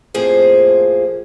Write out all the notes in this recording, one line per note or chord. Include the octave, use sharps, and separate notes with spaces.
F2 A2 F3 A#3 G#4 C5